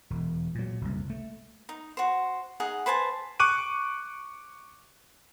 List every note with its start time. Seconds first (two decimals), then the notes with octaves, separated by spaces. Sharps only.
0.10 E1
0.55 A#2 F#3
0.81 F#1 C2
1.10 A3
1.69 D#4
1.97 F#4 C5
2.60 D#4 G#4 F#5
2.86 B4 C5 G#5 A5
3.40 C#6 D6 F#6 D#7